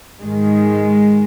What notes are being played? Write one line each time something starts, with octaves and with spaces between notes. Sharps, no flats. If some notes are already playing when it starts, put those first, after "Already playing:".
G#2 D#3 G#3